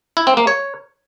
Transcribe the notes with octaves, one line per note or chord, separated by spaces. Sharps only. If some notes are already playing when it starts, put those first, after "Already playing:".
E4
C4
A#3
C#5